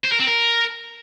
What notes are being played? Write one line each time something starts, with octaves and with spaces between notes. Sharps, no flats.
C5
A#4
C4
A#4